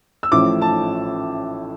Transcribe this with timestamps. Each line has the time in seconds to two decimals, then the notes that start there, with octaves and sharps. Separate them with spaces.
0.23 E6
0.32 A1 A2 F3 D6
0.62 A5